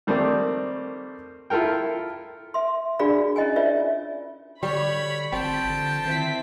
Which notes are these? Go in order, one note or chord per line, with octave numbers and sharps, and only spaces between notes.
D#3 G3 A3 A#3 C4
E4 F4 A4 A#4 G5
E5 C6
D4 F#4 G#4 D5 F5 B5
C#4 E4 D#5 G5 G#5
F4 C#5 D5 E5
D3 G3 C#5 B5
G#1 F3 C4 G5 A5
D3
D#3 C4 E4 B6